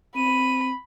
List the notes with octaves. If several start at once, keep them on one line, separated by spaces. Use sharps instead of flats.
C4 B5 D#7